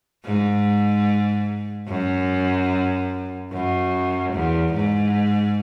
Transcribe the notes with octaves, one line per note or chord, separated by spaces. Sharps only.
G#2
F#2
F#2
E2
G#2